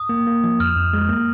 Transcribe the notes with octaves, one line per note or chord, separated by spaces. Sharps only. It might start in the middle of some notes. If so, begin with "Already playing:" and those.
Already playing: D#6
A#3
A#3
F3
F2 F6
F2
G#3
A#3